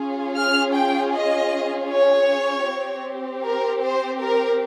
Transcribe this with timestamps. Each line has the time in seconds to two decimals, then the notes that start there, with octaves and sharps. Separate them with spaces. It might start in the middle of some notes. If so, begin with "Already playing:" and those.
Already playing: C#4 F4 G#4
0.36 F6
0.75 G5
1.13 D#5
1.90 C#5
2.68 C4 G4
3.45 A#4
3.83 C5
4.22 A#4